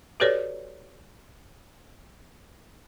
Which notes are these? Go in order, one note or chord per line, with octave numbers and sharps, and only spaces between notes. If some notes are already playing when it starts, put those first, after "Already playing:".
F#4 G4 A4 B4 C#5 D5